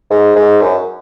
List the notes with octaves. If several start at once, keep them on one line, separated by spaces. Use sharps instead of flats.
G#2
G#2
F#2